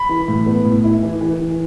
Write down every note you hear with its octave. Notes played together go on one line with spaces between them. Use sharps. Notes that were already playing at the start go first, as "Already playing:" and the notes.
Already playing: B5
E3
A2
B3
A2
E4
E3
E3
E3